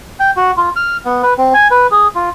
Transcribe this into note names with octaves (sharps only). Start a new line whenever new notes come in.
G5
F#4
F4
F6
B3
B4
C4
G#5
B4
G#4
F4